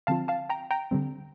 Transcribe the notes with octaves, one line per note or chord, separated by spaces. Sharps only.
D3 F3 C4 F4 F5 A5
F5 A5
G5 A#5
G5 A#5
D3 G3 C4